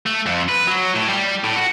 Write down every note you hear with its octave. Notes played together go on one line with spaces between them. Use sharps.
A3
F2
B4
F#3
A2
G3
A2
F#4